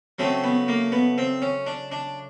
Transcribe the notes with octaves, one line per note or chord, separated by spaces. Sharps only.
C#3 F#3 A3 C4
B3
A#3
B3
C4
C#4
D4
D4